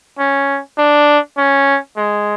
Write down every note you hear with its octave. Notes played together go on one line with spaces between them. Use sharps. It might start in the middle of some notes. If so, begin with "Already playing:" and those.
C#4
D4
C#4
G#3